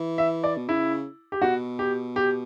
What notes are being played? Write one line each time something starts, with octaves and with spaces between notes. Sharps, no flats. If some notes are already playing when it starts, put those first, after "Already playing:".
Already playing: E3
E5
D5
B2
C#3 E4
G4
B2 F#4
G4
G4